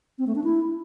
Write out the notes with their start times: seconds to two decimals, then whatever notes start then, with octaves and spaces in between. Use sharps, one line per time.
0.18 C4
0.27 A3
0.35 D4
0.44 E4